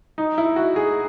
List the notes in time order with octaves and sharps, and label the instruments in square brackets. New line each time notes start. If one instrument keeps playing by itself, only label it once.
[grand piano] D#4
E4
F#4
G#4